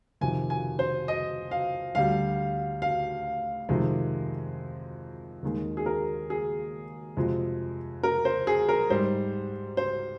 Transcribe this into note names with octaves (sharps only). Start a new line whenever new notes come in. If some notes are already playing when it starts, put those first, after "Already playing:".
F2 C3 D#3 G#5
G#5
C5
D#5
F5
D2 D3 G3 F5
F5
F2 C3 D#3 G#3
D#2 D#3 G#3
G#4
A#4
G#4
F2 C3 F3 G#3
A#4
C5
G#4
A#4
G#2 G3 C5
C5